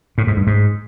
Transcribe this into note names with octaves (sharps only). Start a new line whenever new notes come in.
A2
G#2
G2
G#2